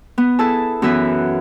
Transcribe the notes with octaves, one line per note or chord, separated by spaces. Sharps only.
B3
E4 G#4 A4 A5
F#2 E3 B3 E5